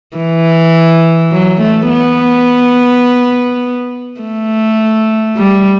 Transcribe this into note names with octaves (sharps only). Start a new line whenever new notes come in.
E3
F#3
A3
B3
A3
G3